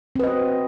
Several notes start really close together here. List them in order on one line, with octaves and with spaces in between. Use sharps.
C4 B4 D#5 F#4